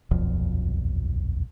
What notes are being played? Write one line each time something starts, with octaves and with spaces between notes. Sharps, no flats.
D#1 B1 F2 F3